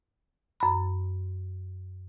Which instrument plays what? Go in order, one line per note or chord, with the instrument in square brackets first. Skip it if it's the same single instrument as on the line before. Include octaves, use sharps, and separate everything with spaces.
[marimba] F#2 B5